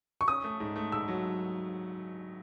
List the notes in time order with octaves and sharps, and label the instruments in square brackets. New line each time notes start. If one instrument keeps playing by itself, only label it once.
[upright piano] C#6
[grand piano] C#4 [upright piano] D#6
[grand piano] A3
G#2
A3
[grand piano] G#2 [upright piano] E6
[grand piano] F#3